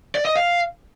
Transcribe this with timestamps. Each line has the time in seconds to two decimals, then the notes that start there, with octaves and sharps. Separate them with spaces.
0.15 D5
0.25 D#5
0.36 F5